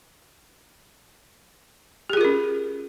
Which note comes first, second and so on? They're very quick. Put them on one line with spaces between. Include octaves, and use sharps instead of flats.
G4 G#4 F4 A#4 C#4